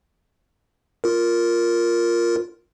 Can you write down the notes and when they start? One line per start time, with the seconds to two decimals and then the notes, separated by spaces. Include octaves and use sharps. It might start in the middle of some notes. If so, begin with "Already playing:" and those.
1.04 F4 A#4